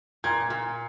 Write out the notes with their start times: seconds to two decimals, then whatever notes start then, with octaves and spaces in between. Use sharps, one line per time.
0.24 A#2 G#6
0.50 A#2